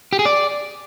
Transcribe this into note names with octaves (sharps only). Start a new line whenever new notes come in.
G4
G#4
D5